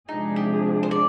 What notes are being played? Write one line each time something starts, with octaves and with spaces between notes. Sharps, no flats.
C3 F3 G#3 D4 D#4 G#4
G4
C5
D5